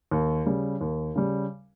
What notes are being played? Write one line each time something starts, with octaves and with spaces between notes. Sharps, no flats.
D#2
C#3 G3
D#2
C#3 G3